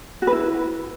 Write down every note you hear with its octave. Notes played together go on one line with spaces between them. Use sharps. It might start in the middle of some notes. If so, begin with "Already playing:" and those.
F#4
B4
E4